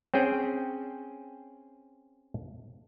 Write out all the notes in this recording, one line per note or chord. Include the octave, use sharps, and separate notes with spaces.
C4 C#4 G#4 G5